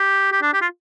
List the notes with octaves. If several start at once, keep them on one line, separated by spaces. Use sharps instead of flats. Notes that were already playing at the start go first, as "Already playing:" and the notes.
Already playing: G4
G4
D4
G4
F4